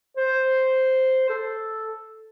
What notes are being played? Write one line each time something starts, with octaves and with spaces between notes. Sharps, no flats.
C5
A4